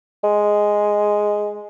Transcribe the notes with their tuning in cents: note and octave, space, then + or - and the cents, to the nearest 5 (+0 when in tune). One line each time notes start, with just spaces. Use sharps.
G#3 +0